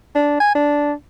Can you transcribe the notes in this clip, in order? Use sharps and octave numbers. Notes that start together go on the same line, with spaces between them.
D4
G#5
D4